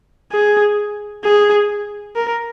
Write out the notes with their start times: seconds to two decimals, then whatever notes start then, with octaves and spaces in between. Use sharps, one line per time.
0.32 G#4
1.24 G#4
2.16 A#4